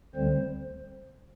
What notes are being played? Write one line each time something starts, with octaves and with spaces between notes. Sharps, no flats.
D2 D3 G3 C4 C5